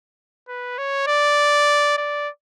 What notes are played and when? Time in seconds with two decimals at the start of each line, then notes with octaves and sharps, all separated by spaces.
0.48 B4
0.78 C#5
1.07 D5
1.98 D5